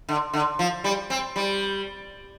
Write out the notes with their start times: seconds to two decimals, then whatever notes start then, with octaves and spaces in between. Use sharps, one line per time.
0.09 D3
0.33 D3
0.59 F3
0.84 G3
1.10 C4
1.36 G3